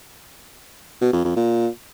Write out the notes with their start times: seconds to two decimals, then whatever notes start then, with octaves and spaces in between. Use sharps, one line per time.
1.01 B2
1.13 F2
1.25 F2
1.36 A#2